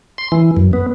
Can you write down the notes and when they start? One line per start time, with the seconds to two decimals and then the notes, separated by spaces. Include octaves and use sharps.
0.18 C6
0.32 E3
0.57 F#2
0.73 B3